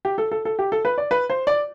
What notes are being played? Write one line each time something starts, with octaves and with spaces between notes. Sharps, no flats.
G4
A4
A4
A4
G4
A4
B4
D5
B4
C5
D5